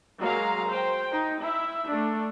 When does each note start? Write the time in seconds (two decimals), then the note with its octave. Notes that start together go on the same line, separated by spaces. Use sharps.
0.21 F#3 G#3 A#3 F5 A#5
0.69 C5 G5
1.11 D#4
1.42 E4 E5
1.86 A3 D4